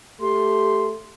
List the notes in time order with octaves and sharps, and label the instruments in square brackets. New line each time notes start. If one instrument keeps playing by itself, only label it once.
[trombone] A3 [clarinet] G4 [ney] C6